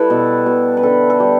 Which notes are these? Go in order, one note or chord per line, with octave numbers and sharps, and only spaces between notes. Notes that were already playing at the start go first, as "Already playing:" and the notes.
Already playing: G3 E4 A4 B4
B2
B2
B4
D3 A4
A4
G3 G4